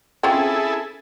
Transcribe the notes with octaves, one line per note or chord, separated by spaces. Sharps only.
C4 C#4 E4 F4 G#4 A4